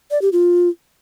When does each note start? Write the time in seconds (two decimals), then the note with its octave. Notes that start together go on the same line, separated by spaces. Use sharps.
0.11 D5
0.22 G4
0.33 F4